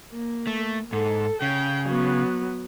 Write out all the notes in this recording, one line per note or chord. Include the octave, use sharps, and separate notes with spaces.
A#3
A3
G#2 A4
C#3 G5
F#3 B3